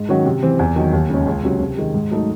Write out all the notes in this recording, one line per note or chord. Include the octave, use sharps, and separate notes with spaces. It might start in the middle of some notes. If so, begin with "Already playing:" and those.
Already playing: G#2
D#3 F#3 C#4 F#4
C3
E3 C4
E2
D#3 F#3
D#2
C#3 G#3 C#4
C#2
C3 F#3 C#4
C3
D#3 G#3
G#2
F#3 A3 D#4 A4